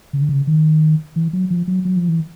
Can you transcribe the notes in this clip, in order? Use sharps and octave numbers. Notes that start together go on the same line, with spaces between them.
C#3
D3
C#3
D#3
E3
F#3
F3
F#3
F#3
F3
E3